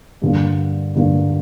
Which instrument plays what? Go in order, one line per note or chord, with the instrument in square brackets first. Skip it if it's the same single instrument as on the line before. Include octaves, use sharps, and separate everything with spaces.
[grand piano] G2 D3 A#3
G2 D3 A#3